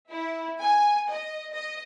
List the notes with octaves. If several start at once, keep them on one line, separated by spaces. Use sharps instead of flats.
E4
G#5
D#5
D#5